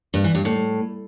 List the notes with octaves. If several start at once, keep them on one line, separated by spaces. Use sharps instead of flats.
G2
E3
G2
A2